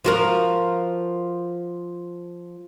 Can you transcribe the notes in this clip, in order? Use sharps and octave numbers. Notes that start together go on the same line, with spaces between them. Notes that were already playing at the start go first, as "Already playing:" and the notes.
F3 F#4 A#4